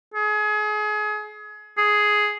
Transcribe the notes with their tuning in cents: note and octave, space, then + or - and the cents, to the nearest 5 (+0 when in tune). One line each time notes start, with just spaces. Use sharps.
G#4 +30
G#4 +5